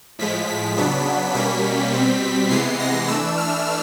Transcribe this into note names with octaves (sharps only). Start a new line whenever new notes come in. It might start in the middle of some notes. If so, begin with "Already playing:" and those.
A2 F3 G#3 B6
B6
C#3 F#3 B3 D4 B6
B2 G3 A#3 C#4 B6
B2 G3 C4
C3 E3 G#3 B3 C7
A#6
E3 A3 D4 E6
F6